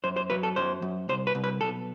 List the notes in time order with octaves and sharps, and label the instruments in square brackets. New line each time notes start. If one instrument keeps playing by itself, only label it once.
[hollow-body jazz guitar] F#2 C5
C5
F#3 B4
A4
F#2 C5
F#2
C2 C5
B4
C2
B4
B1 A4